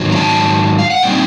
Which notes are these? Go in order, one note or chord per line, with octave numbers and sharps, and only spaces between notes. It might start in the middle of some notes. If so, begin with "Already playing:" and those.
Already playing: G#2 D#3 F#3
A#5
G5 A5
F5
F#5
A#2 G3 C4 D#4 G5